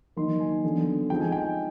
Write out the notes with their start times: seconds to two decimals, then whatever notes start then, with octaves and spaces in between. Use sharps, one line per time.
0.17 D#3 F#3 A#3 D#4 C6
0.40 G#5
0.64 D3 F#3 B3 D4
1.10 F3 G#3 C4 D#4 G5
1.21 G#5
1.32 G5